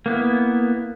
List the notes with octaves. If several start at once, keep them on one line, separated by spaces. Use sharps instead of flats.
A#3 B3 E4